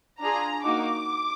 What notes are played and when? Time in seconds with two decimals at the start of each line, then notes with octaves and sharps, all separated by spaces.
0.20 D4 F4 G#4 A#5
0.65 A#3 D#4 F#4 D6